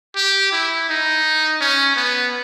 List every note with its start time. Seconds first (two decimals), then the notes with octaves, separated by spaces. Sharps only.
0.16 G4
0.52 E4
0.89 D#4
1.61 C#4
1.96 B3